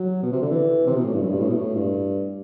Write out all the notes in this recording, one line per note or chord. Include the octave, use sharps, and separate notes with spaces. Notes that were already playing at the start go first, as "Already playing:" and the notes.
Already playing: F#3
B2
C3
D3
E3
C3
B2
A2
G2
F#2
G2
A2
B2
A2
G2